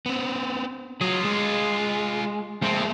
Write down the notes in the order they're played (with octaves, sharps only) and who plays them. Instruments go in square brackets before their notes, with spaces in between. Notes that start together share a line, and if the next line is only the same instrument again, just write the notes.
[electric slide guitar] B3 C4
[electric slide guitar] F#3 [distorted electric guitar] F4 G#4
[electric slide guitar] G#3
[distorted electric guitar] F3 C4 [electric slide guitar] G#3 A#3 E5